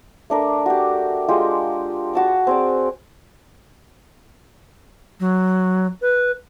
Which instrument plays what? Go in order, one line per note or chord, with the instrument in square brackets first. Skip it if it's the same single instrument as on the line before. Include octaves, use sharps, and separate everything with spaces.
[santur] A3 D4 A#4
F#4 G4
G#3 F4 G4
F#4 A5 D#6
C4 G#4 D5
[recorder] F#3
B4